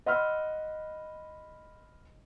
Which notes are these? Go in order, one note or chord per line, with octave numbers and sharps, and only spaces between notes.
D#5 F#5 B5 C6 E6 F6